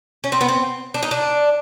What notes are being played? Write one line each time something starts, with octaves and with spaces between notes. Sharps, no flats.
C#4
C4
B3
C4
D4
D#4
D4